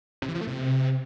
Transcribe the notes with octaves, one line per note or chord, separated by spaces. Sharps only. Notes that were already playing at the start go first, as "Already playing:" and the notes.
C3
E3
F3
A3
C3